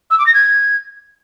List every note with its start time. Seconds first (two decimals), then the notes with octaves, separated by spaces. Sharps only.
0.10 E6
0.18 D6
0.26 A#6
0.34 G#6